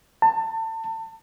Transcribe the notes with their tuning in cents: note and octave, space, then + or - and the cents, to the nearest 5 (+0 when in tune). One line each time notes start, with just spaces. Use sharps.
A5 +30